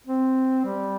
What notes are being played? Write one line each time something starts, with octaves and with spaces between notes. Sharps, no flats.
C4
G3